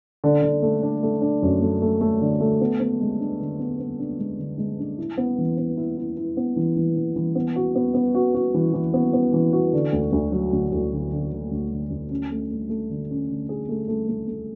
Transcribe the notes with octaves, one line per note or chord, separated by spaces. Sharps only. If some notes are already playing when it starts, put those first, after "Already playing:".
D3
D3
A3
D4
A3
D4
F#2
A3
A3
A3
D3
A3
B3
B3
G#3
D4
D3
B3
B3
D4
G#3
D3
G#3
D4
E4
B3
E3
B3
E4
E4
E4
B3
E3
E3
E3
E3
B3
F#4
B3
B3
F#4
F#4
E3
E3
B3
B3
E3
F#4
D3
D2
D2
F#3
D2
D2
D3
D3
D3
D2
D3
D2
C#4
A3
A3
A3
D3
C#4
D3
G#4
A3
A3
A3
A3